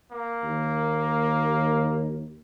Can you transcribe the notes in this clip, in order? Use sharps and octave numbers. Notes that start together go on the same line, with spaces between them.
A#3
D#2